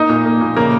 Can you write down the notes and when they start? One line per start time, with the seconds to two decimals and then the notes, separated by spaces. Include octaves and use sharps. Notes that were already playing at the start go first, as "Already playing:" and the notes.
Already playing: A#3 D#4 D#5
0.10 A#2
0.26 A#3
0.41 A#2
0.56 C#3 A#3 A#4